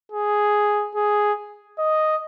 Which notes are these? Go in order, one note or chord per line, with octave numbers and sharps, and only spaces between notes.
G#4
G#4
D#5